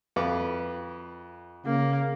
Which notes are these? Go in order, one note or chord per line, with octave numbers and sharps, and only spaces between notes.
F2 B4 D6
C#3 A#3